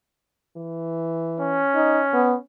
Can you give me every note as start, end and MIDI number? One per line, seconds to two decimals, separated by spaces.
0.57 1.64 52
1.40 2.43 61
1.75 2.01 63
2.13 2.35 59